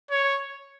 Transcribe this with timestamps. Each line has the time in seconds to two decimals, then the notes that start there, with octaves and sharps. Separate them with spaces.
0.11 C#5